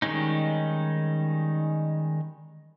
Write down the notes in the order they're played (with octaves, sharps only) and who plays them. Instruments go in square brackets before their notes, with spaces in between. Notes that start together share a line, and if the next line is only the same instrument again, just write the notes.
[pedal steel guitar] D#3 G3 G#3 C#4 D#4